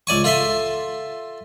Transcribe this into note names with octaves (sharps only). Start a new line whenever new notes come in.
C#2 D5 G#5 C#6
F4 A4 E5 C6